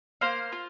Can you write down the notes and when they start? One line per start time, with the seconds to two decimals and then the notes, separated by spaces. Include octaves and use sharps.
0.21 A#3 C5 F5
0.52 F4